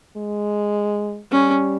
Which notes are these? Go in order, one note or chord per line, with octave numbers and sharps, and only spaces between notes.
G#3
G3 C#4